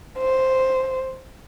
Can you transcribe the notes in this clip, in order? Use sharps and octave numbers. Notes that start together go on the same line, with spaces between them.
C5